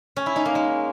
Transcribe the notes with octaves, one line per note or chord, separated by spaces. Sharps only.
C#4
E4
D#4
A#3
G#3